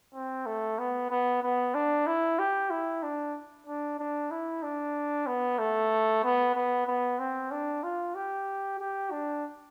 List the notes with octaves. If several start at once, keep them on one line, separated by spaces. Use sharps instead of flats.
C4
A3
B3
B3
B3
D4
E4
G4
E4
D4
D4
D4
E4
D4
B3
A3
B3
B3
B3
C4
D4
F4
G4
G4
D4